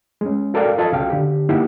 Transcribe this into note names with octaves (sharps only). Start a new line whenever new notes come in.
G#3 C#4
F#4 A4 A#4 D5 F5 G5
F4 A4 D#5 F5 A5
C2 C#3 F#4 F5 G5
D3 G4
A#3 D#4 E4 G4 F#5